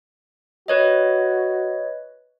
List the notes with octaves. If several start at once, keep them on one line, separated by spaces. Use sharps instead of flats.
F#4 B4 C#5 D#5